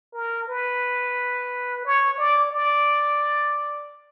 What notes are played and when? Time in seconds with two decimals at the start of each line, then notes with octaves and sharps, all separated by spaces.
0.13 A#4
0.48 B4
1.85 C#5
2.18 D5
2.52 D5